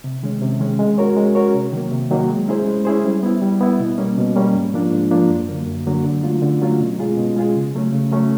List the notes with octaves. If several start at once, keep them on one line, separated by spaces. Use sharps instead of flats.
C3
D#3 G#3 C#4
C3
D#3 G#3 C#4
G#3
C#4 F#4 A#4 C#5
G#3
C#4 F#4 A#4 C#5
C3
D#3 F#3 A#3
C3
D#3 F#3 A#3
G#3
C#4 E4 G#4 C5
G#3
C#4 E4 G#4 C5
G3
B3 E4
G3
B3 E4
B2
G3 A#3 C#4
B2
G3 A#3 C#4
G#2
F3 A#3 D4 F4
G#2
F3 A#3 D4 F4
F#2
D3 F#3 A#3
F#2
D3 F#3 A#3
D3
F#3 A3 C#4 F4
D3
F#3 A3 C#4 F4
B2
G#3 C#4 F4 G#4
B2
G#3 C#4 F4 G#4
C#3
F#3 A3 C#4
C#3
F#3 A3 C#4